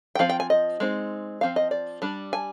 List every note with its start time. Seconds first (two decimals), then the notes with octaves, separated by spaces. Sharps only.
0.15 G5
0.19 F3 C4 F5
0.30 G5
0.40 G#5
0.50 D#5
0.80 G#3 C4 D#4
1.41 F3 C4 F5
1.56 D#5
1.71 D5
2.02 G3 D4
2.33 G#5